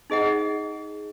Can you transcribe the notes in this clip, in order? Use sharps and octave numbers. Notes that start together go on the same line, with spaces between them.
D#4 G#4 D#5 F#5